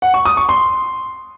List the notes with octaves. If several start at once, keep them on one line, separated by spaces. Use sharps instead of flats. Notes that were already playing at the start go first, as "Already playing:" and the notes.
F#5
C#6
D#6
C#6
C6